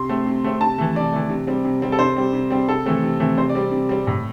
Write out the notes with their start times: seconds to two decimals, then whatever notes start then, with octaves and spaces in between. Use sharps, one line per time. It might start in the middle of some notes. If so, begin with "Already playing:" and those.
Already playing: C3 C6
0.09 A3 C4
0.26 C3
0.44 A3 C4
0.61 C3 A5
0.78 E3 A3
0.95 C3 D5
1.12 E3 A3
1.30 C3
1.47 G3 C4
1.65 C3
1.82 G3 C4
1.92 A4
1.99 C3 C5
2.16 G3 C4
2.33 C3
2.50 G3 C4
2.68 C3 A4
2.86 E3 A3 C4
3.03 C3
3.20 E3 A3 C4
3.37 C3 C5
3.49 D5
3.55 G3 C4
3.72 C3
3.89 G3 C4
4.07 A2